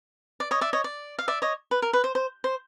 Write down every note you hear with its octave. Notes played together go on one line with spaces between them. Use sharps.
D5
C#5 D#5
D5 E5
C#5 D#5
D5
F5
D5 E5
C#5 D#5
B4
A#4
B4
C5
C5
C5